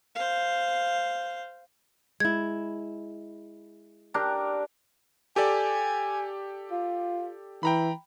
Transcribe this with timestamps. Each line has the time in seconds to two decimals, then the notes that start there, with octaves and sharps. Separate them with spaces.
0.15 C5 F5
2.20 G#3 E4 G#6
4.14 D4 G4 A#4
5.36 G4 A4 D5 G#5
6.71 F4
7.63 E3 G5 A#5 B5